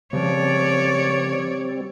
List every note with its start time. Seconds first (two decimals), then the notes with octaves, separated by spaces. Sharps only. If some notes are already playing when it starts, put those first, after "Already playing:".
0.13 C#3 F3 G3 C4 C#5 D5